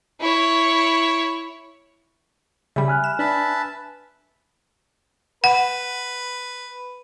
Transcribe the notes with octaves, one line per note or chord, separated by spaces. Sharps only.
E4 C#5
C#3 G3 E5 B5
G#5 F6 F#6
E7
D4 B4 E5 A5
B4 F#5